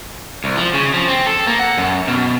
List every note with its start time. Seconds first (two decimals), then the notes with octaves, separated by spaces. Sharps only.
0.44 C2
0.57 F3
0.74 C#3
0.94 F3
1.08 C4
1.26 A4
1.47 A#3
1.59 F#5
1.78 F#2
2.08 B2